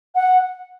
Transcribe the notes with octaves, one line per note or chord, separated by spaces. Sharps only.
F#5